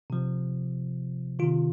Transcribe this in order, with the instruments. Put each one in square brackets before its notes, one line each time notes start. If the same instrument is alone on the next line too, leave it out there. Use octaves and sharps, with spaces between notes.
[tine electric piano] C3 F3
C3 D#3 F4